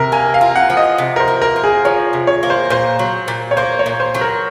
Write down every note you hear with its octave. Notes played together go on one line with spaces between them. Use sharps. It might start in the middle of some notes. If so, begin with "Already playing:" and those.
Already playing: C3 A#4
A#3 G#5
F5
F4
F#5
F3
D#5
C3
A#4
C5
A#3
A#4
F4
G#4
F3 C#5
C3
C#5
A#3
C5
A#2 C5
F#3
A#2
C#5
A#3 C5
C#5
A#2
C5
F#3
A#4